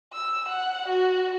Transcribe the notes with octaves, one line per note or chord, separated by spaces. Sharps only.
E6
F#5
F#4